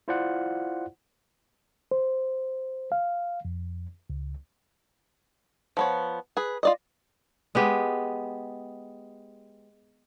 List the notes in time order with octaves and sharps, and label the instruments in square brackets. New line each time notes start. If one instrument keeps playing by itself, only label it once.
[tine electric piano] E4 F4 C5 D5 F5 F#5
[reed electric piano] C5
F5
F2
C#2
[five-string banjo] F3 B3 C#5
G#4 B4
F4 D5 D#5
[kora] G#3 B3 G4